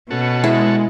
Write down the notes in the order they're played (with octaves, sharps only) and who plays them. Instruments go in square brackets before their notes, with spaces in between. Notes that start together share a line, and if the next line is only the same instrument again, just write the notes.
[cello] B2 [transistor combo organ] C#4 F#4 A4
[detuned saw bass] G#3 [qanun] E4